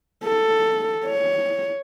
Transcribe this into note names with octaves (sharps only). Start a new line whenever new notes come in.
A4
C#5